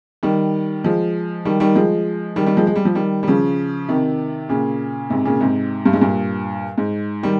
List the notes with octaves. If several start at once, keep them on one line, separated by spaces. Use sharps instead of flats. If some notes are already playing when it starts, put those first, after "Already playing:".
D#3 G3
F3 G#3
D#3 G3
D#3 G3
F3 G#3
D#3 G3
D#3 G3
F3 G#3
G#3
G3
F3
D#3 G3
G3
C#3 F3
C3 D#3
A#2 C#3
G#2 C3
A#2 C#3
G#2 C3
G2
G#2
G2 A#2
G#2
D#3 G3